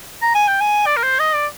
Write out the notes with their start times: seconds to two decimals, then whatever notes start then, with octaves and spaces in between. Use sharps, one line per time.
0.22 A#5
0.35 G#5
0.48 G5
0.61 G#5
0.86 D5
0.97 A#4
1.03 C5
1.19 D#5
1.35 D5